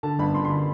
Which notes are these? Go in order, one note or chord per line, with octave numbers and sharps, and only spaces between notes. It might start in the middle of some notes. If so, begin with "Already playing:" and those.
D3 A5
G1 B5
G1 C6
C6
B5